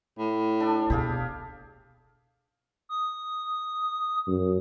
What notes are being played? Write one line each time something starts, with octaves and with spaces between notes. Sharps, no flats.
A2
D4 A4
B2 G4 G#4 F5
D#6
F#2